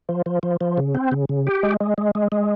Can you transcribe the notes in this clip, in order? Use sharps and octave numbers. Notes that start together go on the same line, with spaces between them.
F3
F3
F3
F3
C#3
C4
C#3
C#3
G4
G#3
G#3
G#3
G#3
G#3